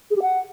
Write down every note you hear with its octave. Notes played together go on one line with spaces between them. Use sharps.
G#4
G4
F#5